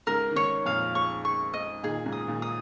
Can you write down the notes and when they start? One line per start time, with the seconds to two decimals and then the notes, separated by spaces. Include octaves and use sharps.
0.07 G#2 C#3 A#4
0.31 D#3
0.36 G#2 C#3 C#5
0.66 F2 A#2 F5
0.95 C#6
1.25 C#6
1.54 D#5
1.83 A#2 D#3 G#4
2.05 G#2 C#3
2.12 D#6
2.27 A#2 D#3
2.42 D#6